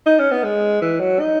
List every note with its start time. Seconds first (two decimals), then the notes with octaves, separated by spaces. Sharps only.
0.06 D#4
0.19 C#4
0.31 B3
0.44 G#3
0.82 E3
1.00 F#3
1.19 D#4